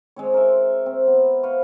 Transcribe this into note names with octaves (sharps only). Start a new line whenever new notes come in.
G#3 C4 C#5
A#4 E5
C4
B3
B4 C5 F5 C#6